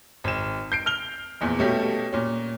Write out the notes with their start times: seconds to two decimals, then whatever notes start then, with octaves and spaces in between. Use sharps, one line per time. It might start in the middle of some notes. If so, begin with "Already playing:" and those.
0.24 G#1 E7
0.72 G6 C7 D7
0.86 F6 F7 G7
1.41 A#1 E2 A#2
1.59 B2 G3 A3 C#4 G4
2.12 A#2 C#4